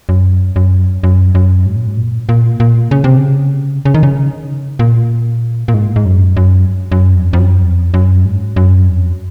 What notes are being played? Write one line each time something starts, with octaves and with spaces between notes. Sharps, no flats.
F#2
F#2
F#2
F#2
G#2
A#2
G#2
A#2
A#2
A#2
C#3
C3
C#3
C#3
D#3
C#3
A#2
A#2
G#2
G#2
F#2
F#2
F#2
F2
F2
F#2
F2
F#2
G#2
F#2
F2